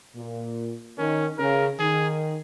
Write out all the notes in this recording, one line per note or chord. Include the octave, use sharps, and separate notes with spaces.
A#2
D#3 C#4
C#3 A#4
D#3 G#4